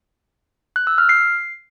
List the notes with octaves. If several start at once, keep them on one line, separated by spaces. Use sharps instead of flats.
F#6
E6
F6
C7